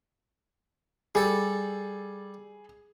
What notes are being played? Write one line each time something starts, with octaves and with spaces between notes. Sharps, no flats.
G3 G#4 A4